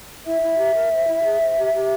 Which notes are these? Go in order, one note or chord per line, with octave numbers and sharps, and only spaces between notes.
E4 E5
E4
G4
A#4
C5
E4
G#4
C5
G4
G4